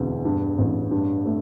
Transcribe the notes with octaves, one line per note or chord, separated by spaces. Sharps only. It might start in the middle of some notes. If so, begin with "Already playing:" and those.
Already playing: E1 D2
G2
A1
G2
A3